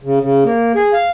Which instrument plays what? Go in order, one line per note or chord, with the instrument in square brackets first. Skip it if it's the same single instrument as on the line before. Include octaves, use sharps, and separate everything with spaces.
[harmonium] C#3
C#3
A#3
G#4
F5